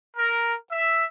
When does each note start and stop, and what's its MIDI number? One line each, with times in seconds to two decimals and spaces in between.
0.17 0.54 70
0.71 1.05 76